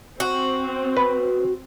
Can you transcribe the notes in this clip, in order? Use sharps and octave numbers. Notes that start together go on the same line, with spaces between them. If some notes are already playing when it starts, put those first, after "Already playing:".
C4 F#4
B4